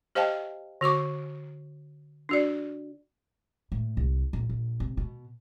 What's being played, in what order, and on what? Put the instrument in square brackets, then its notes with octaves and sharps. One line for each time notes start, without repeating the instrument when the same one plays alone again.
[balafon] G4 C5 D#5 F5 G5 A5
D3 F#4 C#6 D6
D4 F#4 D5
[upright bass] A2
C2
A#1
A#1
C3
B2